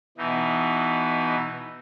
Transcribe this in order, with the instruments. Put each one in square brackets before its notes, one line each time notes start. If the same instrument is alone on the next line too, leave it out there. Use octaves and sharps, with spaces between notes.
[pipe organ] B2 E3 D#4